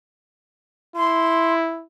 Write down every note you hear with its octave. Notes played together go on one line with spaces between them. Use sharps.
E4 C6